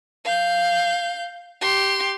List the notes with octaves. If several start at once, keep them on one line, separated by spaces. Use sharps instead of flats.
F5 G6
G4 C6